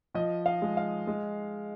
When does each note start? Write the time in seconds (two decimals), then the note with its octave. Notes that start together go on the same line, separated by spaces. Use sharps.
0.14 F3 D#5
0.46 F5
0.62 G#3
0.77 F5
1.07 G#3